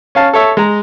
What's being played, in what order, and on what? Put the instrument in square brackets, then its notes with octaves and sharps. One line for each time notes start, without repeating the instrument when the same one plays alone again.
[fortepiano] C#4 F5 A5
A4 C#5 E5
G#3 A#5